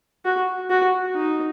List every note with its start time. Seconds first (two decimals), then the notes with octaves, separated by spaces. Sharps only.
0.25 F#4
0.70 F#4
1.15 D#4